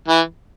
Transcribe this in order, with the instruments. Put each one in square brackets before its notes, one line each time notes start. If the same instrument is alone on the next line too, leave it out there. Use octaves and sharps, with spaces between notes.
[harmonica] E3